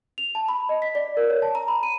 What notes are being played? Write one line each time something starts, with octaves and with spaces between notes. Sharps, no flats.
F7
A5
B5
D#5
B6
D5
A#4
C#5
A5
A#5
B5
D#7